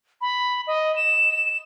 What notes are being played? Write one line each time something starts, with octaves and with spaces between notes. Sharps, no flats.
B5
D#5
E7